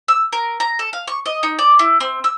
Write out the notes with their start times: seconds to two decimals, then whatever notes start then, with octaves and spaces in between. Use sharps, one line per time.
0.08 E6
0.32 A#4
0.60 A#5
0.79 A4
0.93 F5
1.07 C#6
1.26 D#5
1.43 D#4
1.59 D5
1.79 E4
2.00 C4
2.24 E6